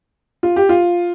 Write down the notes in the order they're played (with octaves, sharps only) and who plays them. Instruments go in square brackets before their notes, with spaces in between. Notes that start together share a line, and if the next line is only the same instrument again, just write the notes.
[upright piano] F4
G4
F4